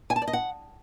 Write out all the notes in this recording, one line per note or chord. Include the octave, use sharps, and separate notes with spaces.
G#5
A5
D5
D#5
F#5